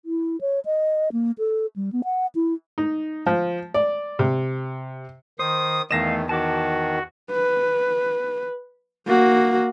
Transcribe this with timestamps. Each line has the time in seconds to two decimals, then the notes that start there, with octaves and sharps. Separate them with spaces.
0.05 E4
0.41 C#5
0.65 D#5
1.12 A#3
1.38 A4
1.76 G3
1.93 B3
2.04 F#5
2.35 E4
2.78 D#4
3.26 F3
3.74 D5
4.19 C3
5.39 D#3 C5 D#6
5.91 E2 D#3 A3 D#5 F5 A#6 E7
6.29 D#3 F#4 A5 D6
7.32 B4
9.07 A#3 F#4